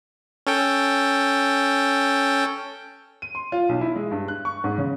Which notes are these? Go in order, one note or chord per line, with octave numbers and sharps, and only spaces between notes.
C#4 A4 G5
D#7
C6
F4
B1
E4
G#3
G2
F#6
C#6
G#2
C#3